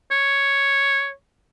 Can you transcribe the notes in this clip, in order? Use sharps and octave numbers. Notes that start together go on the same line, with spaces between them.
C#5